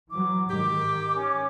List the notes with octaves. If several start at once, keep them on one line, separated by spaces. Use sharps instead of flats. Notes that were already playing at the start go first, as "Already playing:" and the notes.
E3 F#3 D6
G#2 D#3 G4 D6
C#4